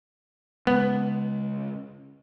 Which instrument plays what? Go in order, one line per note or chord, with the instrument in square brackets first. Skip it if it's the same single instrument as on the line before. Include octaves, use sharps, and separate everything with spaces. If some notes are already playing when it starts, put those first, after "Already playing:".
[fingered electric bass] C#3 G#3 [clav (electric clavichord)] B3